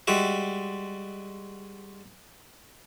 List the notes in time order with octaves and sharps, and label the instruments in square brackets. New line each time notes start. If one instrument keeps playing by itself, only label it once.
[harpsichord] G3 G#3 F#4 E5